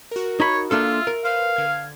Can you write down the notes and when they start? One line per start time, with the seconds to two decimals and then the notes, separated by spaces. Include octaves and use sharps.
0.11 F#4 A#4
0.40 D#4 C#5 B5
0.71 A#3 D4 F4 A4 E5 C6 E6
1.07 A#4
1.25 B4 C5 F5
1.56 D3 G#6